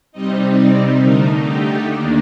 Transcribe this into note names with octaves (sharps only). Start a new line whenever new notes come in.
C3 G3 C4 D#4 D#5
D5
D3 A3 D#4 A#4
G4
D#2 D#3 A#3 D4